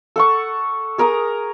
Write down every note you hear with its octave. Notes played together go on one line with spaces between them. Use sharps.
A4 F#5 C#6
G#4 A#4 A#5 D#6